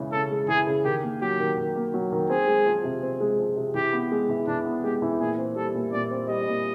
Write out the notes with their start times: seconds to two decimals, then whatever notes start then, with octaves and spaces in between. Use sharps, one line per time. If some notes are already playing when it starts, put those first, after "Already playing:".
Already playing: C#3 E3 G#3
0.12 C#4 A4
0.30 G#3
0.48 E3 G#4
0.67 C#3
0.85 D#3 G4
1.03 A#3
1.21 F#3 G4
1.40 D#3
1.57 D#3
1.76 A#3
1.94 F#3
2.12 D#3
2.30 C4 G#4
2.48 G#3
2.66 F3
2.84 C3
3.03 C4
3.20 G#3
3.39 F3
3.57 C3
3.74 E3 G4
3.93 B3
4.11 G#3
4.29 E3
4.47 E3 D4
4.65 B3
4.84 G#3 G4
5.02 E3
5.20 A#2 G#4
5.38 C4
5.56 G3 A4
5.74 A#2
5.92 A#2 D5
6.11 C4
6.29 G3 D#5
6.47 A#2